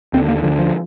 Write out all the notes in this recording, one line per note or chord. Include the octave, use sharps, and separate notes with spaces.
D#2 D3 C4
A#3
D2 D3 F3
F3